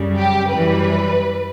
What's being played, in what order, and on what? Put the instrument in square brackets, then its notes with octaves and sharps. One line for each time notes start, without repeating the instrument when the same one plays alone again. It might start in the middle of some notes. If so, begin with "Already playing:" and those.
Already playing: [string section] F#2 C#3 G3
G4
F#2 E3 G3 B4